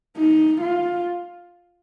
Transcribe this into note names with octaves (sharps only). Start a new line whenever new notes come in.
D#4
F4